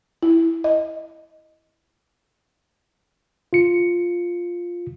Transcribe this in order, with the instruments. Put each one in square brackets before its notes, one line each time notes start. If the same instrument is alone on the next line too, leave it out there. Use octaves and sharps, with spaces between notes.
[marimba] E4
D#5
[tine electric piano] F4 C#7